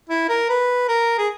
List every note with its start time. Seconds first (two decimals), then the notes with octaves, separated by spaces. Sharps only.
0.09 E4
0.29 A#4
0.49 B4
0.88 A#4
1.18 G#4